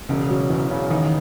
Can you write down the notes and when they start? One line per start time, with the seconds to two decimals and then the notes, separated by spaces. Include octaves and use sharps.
0.09 E1 C#3
0.29 F#3
0.49 E2
0.71 C#3
0.90 A1 D#3